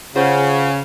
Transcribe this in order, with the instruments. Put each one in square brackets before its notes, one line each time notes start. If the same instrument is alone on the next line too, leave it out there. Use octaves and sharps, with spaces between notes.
[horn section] C#3 [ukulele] F4 C5 F#5